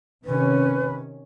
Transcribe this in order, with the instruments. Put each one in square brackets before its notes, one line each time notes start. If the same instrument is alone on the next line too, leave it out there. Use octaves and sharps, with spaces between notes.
[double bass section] C3 D#3 C#4 [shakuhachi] B4